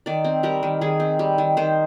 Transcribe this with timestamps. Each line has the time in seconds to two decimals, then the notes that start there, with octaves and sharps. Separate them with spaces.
0.06 D#3 D5
0.24 C4
0.43 G3 A#4
0.63 D#3
0.81 D#3 G#4
1.00 C4
1.19 G3
1.38 D#3
1.57 D#3 C5